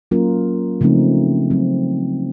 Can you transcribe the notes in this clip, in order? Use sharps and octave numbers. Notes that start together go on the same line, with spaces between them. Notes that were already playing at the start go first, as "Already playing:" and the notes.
F#3 A#3 C#4 F4 A#4
C#3 F3 A3 C4 D#4
C#3 F#3 C4